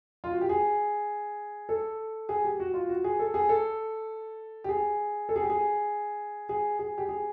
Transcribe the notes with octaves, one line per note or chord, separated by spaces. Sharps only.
F4
F#4
G4
G#4
A4
G#4
G4
F#4
F4
F#4
G#4
A4
G#4
A4
G4
G#4
A4
G#4
G4
G#4
G#4
G#4
G4
G#4